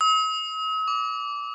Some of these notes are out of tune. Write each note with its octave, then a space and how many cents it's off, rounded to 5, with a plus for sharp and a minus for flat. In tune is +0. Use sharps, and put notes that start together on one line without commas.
D#6 +45
D6 -20